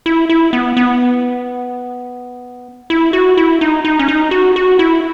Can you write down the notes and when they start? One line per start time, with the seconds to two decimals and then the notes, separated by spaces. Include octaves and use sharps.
0.06 E4
0.29 E4
0.53 B3
0.77 B3
2.90 E4
3.13 F#4
3.37 E4
3.61 D#4
3.85 D#4
3.99 C#4
4.08 D#4
4.31 F#4
4.56 F#4
4.79 E4